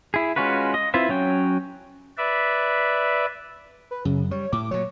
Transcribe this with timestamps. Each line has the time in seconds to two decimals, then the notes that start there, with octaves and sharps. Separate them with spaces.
0.14 E4 G#4
0.36 G#3 C#4 F4 F#4 B4
0.74 D#5
0.94 C4 E4 F4 B4 E5
1.09 F#3 C#4 G5
2.17 B4 D5 E5
3.91 B4
4.05 F#2 C#3
4.31 G3 C#5
4.53 A2 D6
4.71 A#2 F#3 C#5